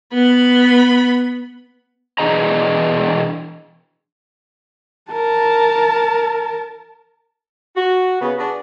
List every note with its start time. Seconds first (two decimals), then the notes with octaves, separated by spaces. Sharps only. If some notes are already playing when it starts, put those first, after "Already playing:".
0.13 B3 B5
2.18 B2 E3 D4 G#4 D#5 A#5
5.11 A#4 A5
7.76 F#4
8.20 C#3 B3
8.38 D4 F#4 G#4 B4